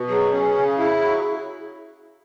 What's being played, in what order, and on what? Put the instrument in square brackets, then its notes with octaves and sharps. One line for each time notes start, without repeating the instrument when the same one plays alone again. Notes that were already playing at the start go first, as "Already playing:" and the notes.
Already playing: [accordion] B2
[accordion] F#3 [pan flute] G#4
[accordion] C#4
C#3
E4
F#3